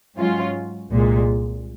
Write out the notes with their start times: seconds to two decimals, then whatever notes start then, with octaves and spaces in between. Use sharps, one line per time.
0.17 G#2 F#3 C#4 F4
0.90 C2 A#2 G#3